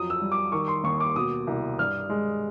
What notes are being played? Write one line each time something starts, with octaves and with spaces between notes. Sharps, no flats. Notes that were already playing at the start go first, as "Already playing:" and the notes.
Already playing: F2 F#3 D#6
E6
G3
D6
D#3 C#6
C6
D#2 C#6
D6
B2 D#6
C2
G2 F6
G#3